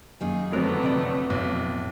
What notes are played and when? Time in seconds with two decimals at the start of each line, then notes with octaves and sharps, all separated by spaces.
0.21 F#2 D#3 A#3 G#4
0.53 F2 D3 F#3 A3 B3 C4 A#4
0.83 C3 D#4 D5
1.30 B1 F2 A2